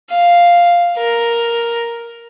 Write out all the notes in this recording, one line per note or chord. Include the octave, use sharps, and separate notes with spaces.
F5
A#4